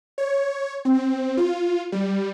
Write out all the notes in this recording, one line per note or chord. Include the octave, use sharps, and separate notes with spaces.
C#5
C4
F4
G3